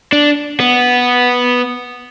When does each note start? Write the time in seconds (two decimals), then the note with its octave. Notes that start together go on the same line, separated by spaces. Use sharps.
0.12 D4
0.60 B3